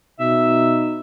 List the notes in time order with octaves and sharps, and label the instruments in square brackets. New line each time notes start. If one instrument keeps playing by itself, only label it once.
[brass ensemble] B2 D#4 [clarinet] E5